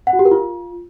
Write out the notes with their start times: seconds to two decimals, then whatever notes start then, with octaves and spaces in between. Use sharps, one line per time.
0.07 F#5
0.13 F#4
0.19 G4
0.25 A#4
0.31 F4